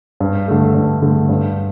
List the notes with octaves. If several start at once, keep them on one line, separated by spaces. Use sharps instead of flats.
G2
D3 A3
G2
D3 A3
G2